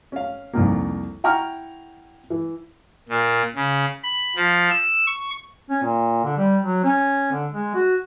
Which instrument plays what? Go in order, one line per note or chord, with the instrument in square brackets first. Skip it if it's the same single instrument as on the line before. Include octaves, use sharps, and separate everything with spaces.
[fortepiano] C#4 F5
C2 F2 D#3 A#3
E4 F#5 G5 A#5 C#6 F6
E3
[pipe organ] A#2
C#3
B5
F3
E6
C#6
[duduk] C#4
A#2
D3
G3
F#3
C#4
D3
G#3
F#4